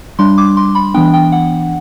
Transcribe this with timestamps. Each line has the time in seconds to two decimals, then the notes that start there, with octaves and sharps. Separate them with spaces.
0.19 G3 D4 C6
0.38 D6
0.57 C6
0.75 B5
0.94 E3 B3 D4 G5
1.14 G5
1.32 F#5